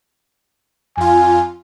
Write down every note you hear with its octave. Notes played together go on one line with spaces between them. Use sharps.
F2 F4 G#5